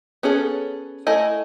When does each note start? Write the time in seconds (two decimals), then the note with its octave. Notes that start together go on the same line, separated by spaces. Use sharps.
0.23 B3 C#4 G#4 A4
1.07 A3 E4 D#5 G#5